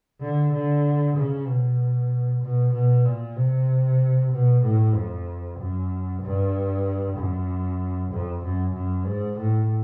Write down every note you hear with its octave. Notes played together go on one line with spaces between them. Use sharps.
D3
D3
C#3
B2
B2
B2
A#2
C3
B2
A2
F2
F#2
G2
F#2
F2
F#2
F#2
G#2
A2